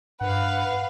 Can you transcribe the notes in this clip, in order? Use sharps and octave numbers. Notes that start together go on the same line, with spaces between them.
G2 B4 F5 F#5